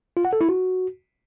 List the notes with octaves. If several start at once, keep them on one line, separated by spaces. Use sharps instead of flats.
F4
F#5
A4
E4
F#4